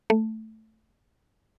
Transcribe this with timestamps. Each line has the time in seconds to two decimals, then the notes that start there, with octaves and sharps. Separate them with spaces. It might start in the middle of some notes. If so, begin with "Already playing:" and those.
0.10 A3